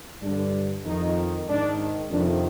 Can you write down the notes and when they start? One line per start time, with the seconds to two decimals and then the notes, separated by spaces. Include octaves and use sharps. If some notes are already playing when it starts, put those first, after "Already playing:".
0.22 G2 D3 D4
0.85 F2 D#3 D#4
1.48 G#2 D#3 D4
2.11 F2 C3 D#3 D4